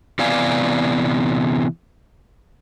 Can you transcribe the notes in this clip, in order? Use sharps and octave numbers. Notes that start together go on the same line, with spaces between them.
C3 E3 B3 D5 F5 G#5